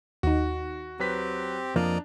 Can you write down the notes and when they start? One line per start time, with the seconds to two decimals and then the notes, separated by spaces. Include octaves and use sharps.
0.23 D#2 D#4 F#4
1.00 F#3 C4 G4 B4 B6
1.76 F2 F3 A#3 D4 D5 D#5 A#5